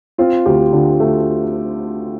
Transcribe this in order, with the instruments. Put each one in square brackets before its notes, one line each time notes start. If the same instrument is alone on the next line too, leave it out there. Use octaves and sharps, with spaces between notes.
[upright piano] C4 [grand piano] F4
[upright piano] D2 [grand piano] G4
[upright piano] D3 [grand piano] F4
[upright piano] A3